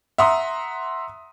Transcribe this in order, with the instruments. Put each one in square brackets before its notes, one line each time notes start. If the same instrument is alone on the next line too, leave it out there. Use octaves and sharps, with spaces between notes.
[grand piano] E5 F#5 A#5 C6 D#6